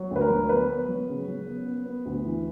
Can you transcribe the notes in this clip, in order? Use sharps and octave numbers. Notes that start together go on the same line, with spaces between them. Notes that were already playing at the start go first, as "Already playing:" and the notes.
Already playing: F#3
D2 B4
A#4
F#3
B3 B4
B3
F#3
C#3
F#3
B3
B3
B3
D2
E3